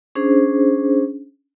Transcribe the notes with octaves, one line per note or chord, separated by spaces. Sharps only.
C#4 D4 G#4 C5